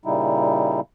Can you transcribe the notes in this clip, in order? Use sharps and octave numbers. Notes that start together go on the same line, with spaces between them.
A#2 C#3 G3 D#4 E4